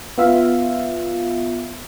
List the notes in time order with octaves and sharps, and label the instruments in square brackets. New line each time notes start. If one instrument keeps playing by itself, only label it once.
[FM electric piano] B3 F4 E5 F5